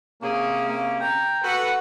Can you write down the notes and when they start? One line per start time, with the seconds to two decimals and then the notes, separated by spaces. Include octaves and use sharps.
0.22 C3 A#3 C#4 G#4
0.69 A#3
1.00 G5 A#5
1.43 F#4 A4 B4 F#5